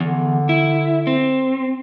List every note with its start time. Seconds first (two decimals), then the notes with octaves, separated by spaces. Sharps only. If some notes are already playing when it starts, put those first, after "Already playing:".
0.01 E2 D3
0.49 E4
1.07 C4